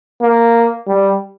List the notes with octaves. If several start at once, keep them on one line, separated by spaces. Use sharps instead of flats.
A#3
G3